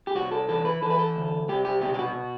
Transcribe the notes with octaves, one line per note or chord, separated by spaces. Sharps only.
G4
C2 F#4
A4
E3 A4
B4
E3 A4
B4
A4
D2
C2 G4
G4
B2 G4
G4
F#4